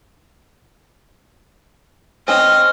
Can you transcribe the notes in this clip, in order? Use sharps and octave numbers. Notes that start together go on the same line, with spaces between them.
C4 C#4 D#5 F6